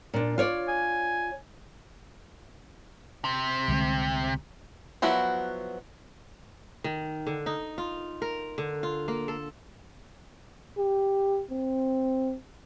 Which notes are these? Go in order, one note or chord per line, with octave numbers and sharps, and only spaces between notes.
A#2 D4
F4 C#5 D5
G#5
C3
C2 D3 G#3
F3 F#3 B3 E4 F#4
D#3
D3
D#4
F4
A#4
D3
F4
A#3
A4
G4
C4